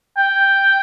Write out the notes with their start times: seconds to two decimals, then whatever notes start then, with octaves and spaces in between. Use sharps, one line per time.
0.17 G5